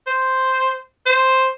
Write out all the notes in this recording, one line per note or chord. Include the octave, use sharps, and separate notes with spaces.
C5
C5